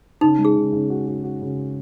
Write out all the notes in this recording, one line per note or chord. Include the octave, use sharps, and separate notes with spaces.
C#3 D#4
G#3
G#4
C#3
C#3
F#4
F#4
F#4
C#3